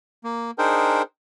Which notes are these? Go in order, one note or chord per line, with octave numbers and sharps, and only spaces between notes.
A#3
D4 D#4 G#4 A#4 C5 G5